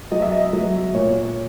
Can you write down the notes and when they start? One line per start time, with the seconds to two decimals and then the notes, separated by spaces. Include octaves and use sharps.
0.11 F#3 D#5
0.22 E5
0.32 D#5
0.53 F#3
0.95 A#2 C#5